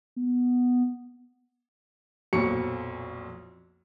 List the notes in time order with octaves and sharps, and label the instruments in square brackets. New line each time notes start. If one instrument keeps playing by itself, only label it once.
[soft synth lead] B3
[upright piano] B1 F2 A#2 F#3 C#6 C#7